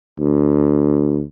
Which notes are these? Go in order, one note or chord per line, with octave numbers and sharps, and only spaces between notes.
D2